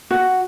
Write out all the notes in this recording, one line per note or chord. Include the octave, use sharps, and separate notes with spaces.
F#4